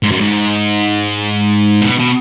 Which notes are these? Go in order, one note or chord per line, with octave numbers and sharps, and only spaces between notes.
G#2
F#2
G#2
B2
B2